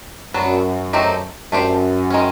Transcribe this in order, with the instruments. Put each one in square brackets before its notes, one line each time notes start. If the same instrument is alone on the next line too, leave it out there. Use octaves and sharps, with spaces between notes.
[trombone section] F#2 [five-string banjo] F#3 B3 D4
[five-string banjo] F#3 A3 C4 D#4 G4
[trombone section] F#2 [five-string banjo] A3 D4 G4 C5
[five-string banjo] D#3 G#3 C#4